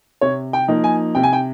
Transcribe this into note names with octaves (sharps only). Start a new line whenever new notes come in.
C3 C#5
G5
F3 A#3 D#4
G#5
C3 G5
G#5
G5